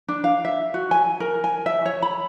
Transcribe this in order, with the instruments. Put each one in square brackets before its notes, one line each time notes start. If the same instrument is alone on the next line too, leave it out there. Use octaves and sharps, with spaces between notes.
[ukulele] D4
F5
E5
F#4
G#5
A#4
G#5
E5
C#5
B5